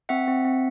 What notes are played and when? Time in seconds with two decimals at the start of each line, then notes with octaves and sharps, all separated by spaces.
0.09 C4 E5 F#5
0.27 C4
0.45 C4